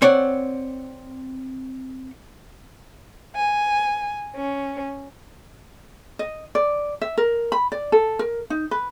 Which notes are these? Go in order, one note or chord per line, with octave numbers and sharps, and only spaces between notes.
C4 C#5 D5 F#5
G#5
C#4
D#5
D5
E5
A#4
B5
D5
A4
A#4
D#4
B4